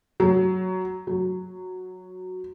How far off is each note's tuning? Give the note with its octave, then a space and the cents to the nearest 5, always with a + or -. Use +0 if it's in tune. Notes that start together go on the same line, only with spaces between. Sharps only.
F#3 +10
F#3 -5